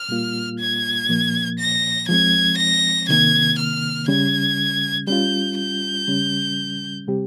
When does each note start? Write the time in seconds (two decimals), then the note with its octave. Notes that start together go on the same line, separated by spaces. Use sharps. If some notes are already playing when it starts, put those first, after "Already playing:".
Already playing: F6
0.09 A#2 G3 A#3 F4
0.59 G#6
1.09 A#2 F3 A#3
1.59 A#6
2.08 F3 G#3 C4 G#6
2.58 A#6
3.09 C3 D#3 A#3 G#6
3.58 F6
4.08 C#3 G3 C#4 G#6
5.07 G3 C#4 F4 G6
5.58 G6
6.08 C#3 G3 C#4
7.07 C3 G3 C4 G4